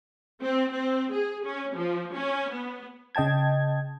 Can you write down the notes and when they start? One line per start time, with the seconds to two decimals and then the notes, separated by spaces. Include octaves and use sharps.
0.42 C4
0.73 C4
1.12 G#4
1.45 C#4
1.75 F3
2.14 C#4
2.52 B3
3.15 C#3 D#5 G5 A5 G#6